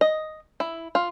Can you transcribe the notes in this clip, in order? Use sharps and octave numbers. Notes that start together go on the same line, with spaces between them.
D#5
E4
F4